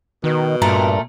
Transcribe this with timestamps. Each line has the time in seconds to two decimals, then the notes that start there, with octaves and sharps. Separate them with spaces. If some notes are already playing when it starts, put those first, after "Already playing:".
0.24 B2 D#3
0.62 G2 A#2 A3 A#4